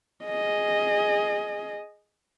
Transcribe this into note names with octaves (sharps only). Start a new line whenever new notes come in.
G#4 D#5